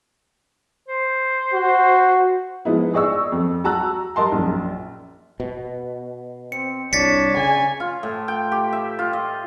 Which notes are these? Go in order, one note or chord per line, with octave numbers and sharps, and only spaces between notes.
C5
F#4
F3 G#3 B3 D#4 E4
G#4 D5 D#5 C#6 E6
F2
F#4 A5 A#5 E6 F#6
G3 A#4 D#5 A5 C6
A#1 F#2
B2
C4 C#7
C2 D4 C#5 A6 B6 C#7
C#3 G#5
F4
A2
G5
G4
E5
F4
D#5